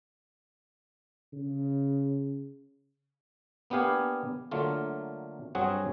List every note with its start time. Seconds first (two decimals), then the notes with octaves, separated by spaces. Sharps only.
1.33 C#3
3.70 A#3 B3 D4 G4 F5 G#5
4.51 D3 F#3 A3 A#3 F4
5.55 G2 F#3 C4 F#4 G#4 F#5